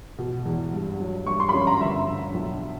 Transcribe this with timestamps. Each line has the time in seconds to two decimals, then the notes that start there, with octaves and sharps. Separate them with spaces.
0.18 B2
0.45 E2
0.73 G2
1.00 F#3
1.27 G2 C#6
1.40 C6
1.49 B5
1.54 C#4 C6
1.67 A#5
1.81 G1 E5
2.08 D3
2.34 B1